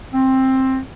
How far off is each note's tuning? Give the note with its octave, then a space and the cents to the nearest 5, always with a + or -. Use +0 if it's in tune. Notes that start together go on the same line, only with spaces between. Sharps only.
C4 +10